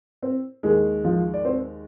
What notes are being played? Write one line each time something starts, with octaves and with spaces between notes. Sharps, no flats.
C4 C5
D#2 D#3 G#3 G#4
F3 F4
D5
C4 C5